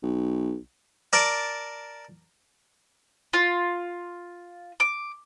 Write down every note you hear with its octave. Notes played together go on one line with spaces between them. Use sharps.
B1
A#4 D5 A5
F4
D6